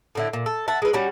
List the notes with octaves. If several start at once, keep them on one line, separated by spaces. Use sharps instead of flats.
A2 D3 E4
A#2
A4
E5 F#5 A5
G#3 B4
G3 C#4 F#4 G4